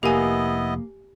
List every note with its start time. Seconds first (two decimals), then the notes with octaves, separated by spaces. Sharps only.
0.03 F1 A#3 B3 E4 G4 D#5 G#5